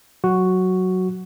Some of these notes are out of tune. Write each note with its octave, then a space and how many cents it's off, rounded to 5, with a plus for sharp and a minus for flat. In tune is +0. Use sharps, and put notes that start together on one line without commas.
F#3 +0 F#4 +0